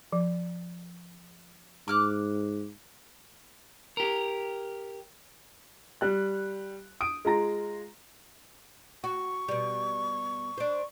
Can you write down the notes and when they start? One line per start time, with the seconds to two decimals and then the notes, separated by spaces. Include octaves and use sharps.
0.13 F3
1.88 G#2 D6 F6 F#6
3.97 G4 A#4
6.01 G3 F#6
7.01 D#6 D7
7.25 G#3 F4 A#5 A#6
9.04 F#4 C#6
9.48 B2 G3
10.58 D4 C5